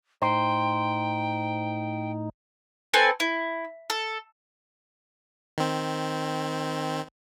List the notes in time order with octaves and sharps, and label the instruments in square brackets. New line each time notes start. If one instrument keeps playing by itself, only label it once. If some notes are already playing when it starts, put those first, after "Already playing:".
[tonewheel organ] A2 D#4 [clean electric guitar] C5 [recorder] G5 [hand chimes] A#5
[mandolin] C4 A4 B4 G#5
E4
A4
[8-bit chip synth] D#3 C4